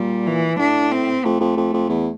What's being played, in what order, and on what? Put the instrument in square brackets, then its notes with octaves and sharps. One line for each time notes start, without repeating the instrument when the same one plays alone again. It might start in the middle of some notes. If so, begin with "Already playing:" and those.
Already playing: [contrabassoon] A#2 [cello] G3
[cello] E3
[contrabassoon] A2 [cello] D4
[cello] C4
[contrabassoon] F2 [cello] A3
[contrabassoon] F2
F2
F2
E2